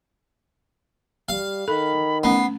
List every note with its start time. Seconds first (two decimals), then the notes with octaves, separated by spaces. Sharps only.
1.29 G3 F5
1.68 D#3 A4 B5
2.24 A3 B3 C#4 C7